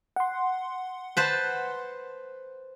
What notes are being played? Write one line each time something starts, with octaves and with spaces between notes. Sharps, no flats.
F#5 C6
B4 C5 A5